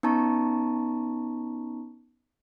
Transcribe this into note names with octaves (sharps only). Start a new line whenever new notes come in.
B3 C#4 D#4 A5 A#5 C#6